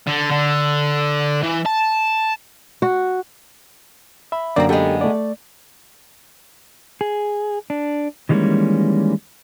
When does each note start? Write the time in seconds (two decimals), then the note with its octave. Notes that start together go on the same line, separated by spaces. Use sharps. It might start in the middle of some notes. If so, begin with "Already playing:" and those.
0.07 D3
0.31 D3
1.43 E3
1.66 A5
2.82 F#4
4.32 E5 B5
4.56 F#2 D3 F#3 A#3 C4 D5 G5 A#5
4.69 G#3 B3 G4 A4 G5
5.01 A3 D5
7.01 G#4
7.70 D4
8.29 D#3 E3 G3 G#3 A#3 C#4